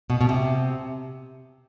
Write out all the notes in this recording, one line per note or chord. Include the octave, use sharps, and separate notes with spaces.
B2
B2
C3